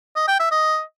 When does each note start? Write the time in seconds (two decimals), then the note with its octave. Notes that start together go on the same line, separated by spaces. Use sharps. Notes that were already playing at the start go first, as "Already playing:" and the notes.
0.16 D#5
0.28 G5
0.40 E5
0.52 D#5